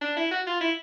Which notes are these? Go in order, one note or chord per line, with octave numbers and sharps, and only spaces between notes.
D4
E4
F#4
F4
E4